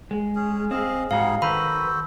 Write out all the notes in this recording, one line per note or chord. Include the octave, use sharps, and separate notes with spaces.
G#3
C#4 G#4
C4 G#4 D#5 F5
G#2 G3 D#4 F#4 G#4 F5 F#5
D#3 F#4 A4 B4 C5 A#5 B5